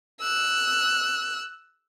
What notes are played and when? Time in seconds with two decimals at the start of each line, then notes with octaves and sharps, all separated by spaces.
0.21 E6 F#6